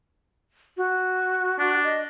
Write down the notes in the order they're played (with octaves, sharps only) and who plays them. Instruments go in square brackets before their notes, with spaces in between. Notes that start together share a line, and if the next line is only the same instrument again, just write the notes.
[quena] F#4
[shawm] D4
[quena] D#5